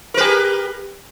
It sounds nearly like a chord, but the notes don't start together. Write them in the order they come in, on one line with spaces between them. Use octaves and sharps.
A#4 B4 G4